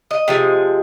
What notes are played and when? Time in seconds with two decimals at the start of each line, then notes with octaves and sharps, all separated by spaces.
0.11 D#5
0.28 C3 F3 G#3